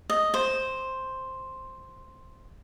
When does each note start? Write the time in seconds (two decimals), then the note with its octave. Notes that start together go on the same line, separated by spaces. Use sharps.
0.10 D#5
0.34 C5